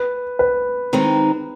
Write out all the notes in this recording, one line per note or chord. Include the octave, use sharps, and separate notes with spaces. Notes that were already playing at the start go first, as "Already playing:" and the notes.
Already playing: B4
B4
D#3 G#3 C4 D#4